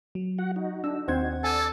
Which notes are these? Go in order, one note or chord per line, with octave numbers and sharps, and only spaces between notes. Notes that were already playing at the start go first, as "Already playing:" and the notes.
F#3
F#4 F#5
D#4 F#4
D4 E6
D#2 C4 C5 F#5 G#6
A4 D5 G#5 A6